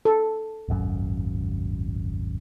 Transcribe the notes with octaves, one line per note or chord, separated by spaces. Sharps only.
A4
D#1 G#1 F#2